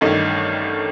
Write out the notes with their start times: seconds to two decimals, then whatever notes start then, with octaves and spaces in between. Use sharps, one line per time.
0.01 A1 G2 D#3 A3 D#4